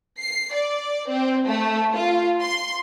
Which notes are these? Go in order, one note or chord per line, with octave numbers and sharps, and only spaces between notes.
C7
D5
C4
A3
F4
C6